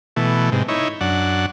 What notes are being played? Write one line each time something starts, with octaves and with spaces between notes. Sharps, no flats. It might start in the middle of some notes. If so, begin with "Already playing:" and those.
B2 E3 A3
G#2 C3
D#4 E4 C#5
F#2 D4 F#5